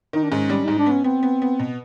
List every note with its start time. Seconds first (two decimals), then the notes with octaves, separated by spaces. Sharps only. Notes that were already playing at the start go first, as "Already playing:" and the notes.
0.13 D#3 D#4
0.23 D4
0.31 G#2 C#4
0.50 G3
0.65 G#2 D#4
0.79 D4
0.86 B3 C#4
1.04 B3 C4
1.23 B3
1.42 B3
1.59 B2